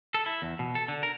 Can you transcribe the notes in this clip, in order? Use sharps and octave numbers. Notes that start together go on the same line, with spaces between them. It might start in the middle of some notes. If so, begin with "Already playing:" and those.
A4
E4
E2
B2
A4
D3
A#4